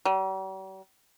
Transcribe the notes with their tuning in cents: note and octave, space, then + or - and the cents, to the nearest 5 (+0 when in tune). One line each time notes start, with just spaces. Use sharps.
G3 -45